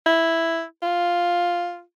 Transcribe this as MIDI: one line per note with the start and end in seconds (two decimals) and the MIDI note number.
0.06 0.63 64
0.82 1.82 65